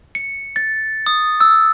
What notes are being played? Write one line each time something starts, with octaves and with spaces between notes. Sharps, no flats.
C#7
A6
D#6
E6